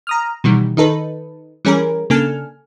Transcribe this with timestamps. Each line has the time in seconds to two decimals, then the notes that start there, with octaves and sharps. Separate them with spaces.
0.07 A#5 D#6 F6
0.44 B2 D#3 E3 G3
0.77 D#3 D#4 A4 B4
1.65 E3 G3 C#4 G#4 A#4
2.10 C#3 A#3 D4 A4 G#5 F6